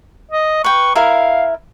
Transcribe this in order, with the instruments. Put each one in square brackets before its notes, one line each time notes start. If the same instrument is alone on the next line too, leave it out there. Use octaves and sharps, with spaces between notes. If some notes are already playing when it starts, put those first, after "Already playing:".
[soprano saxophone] D#5
[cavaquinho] B4 G5 [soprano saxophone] C#6
[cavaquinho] E4 A#4 E5 [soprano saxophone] F5